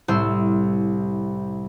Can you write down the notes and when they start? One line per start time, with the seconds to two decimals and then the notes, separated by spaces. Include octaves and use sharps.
0.08 C2 A2 C5 E6